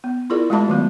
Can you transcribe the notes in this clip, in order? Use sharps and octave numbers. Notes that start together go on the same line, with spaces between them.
B3
E4 F4 G#4 A#4 D5
G#3 A3 F#4 E5 A5 B5
D#3 F#3 A3 B3